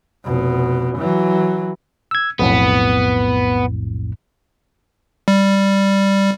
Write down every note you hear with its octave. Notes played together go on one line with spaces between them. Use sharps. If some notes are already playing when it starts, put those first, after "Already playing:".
F1 B2
E3 F#3
E6 G#6
B1 F2 A2 B3
G3